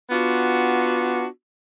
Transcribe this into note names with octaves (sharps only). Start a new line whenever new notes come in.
B3 D4 F4 F#4